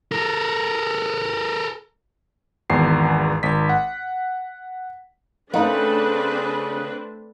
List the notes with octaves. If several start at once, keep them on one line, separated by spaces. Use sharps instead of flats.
A4 A#4
G#1 E2 C7
G#1 B6
F#5
C#3 A3 A#3 C4 D4 D#4 B4